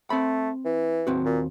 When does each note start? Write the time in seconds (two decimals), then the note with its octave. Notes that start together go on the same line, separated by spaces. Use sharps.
0.10 A3 C4 B5
0.65 E3
1.07 D#2 C4 F#4
1.25 A#2